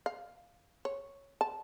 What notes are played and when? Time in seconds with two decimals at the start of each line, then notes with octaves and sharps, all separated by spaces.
0.06 F5
0.85 C#5
1.41 A5